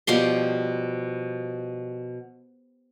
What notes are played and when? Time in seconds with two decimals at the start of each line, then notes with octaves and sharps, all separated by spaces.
0.07 B2 F3 G3 C6